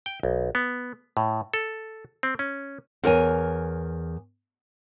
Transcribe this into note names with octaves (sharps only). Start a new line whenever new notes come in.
G5
B1
B3
A2
A4
C4
C#4
E2 A#4 C#5 G#5